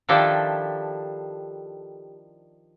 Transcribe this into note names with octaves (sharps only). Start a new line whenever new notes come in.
D#3 F3 D4 E4 G4 A4